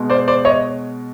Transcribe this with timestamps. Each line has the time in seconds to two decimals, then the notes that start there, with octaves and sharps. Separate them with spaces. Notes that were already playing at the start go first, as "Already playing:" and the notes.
Already playing: B2 G#3
0.10 C5 D5
0.28 C5 D5
0.45 C#5 D#5